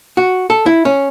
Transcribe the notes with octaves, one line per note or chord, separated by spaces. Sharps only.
F#4
A4
E4
C#4